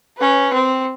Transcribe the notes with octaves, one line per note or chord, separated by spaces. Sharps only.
C#4 B4
C4